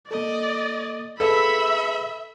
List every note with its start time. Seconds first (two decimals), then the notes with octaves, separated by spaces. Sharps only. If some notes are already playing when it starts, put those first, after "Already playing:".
0.11 A#3 A4 D5 D#5
1.20 G#4 A4 B4 E5 F5 B5 E6